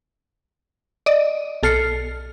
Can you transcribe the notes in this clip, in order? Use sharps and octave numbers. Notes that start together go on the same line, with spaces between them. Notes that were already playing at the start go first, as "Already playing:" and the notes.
D5 D#5
B1 A4 F6 C7 C#7